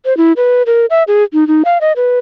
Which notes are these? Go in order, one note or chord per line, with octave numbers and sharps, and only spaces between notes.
C5
E4
B4
A#4
E5
G#4
D#4
D#4
F5
D#5
B4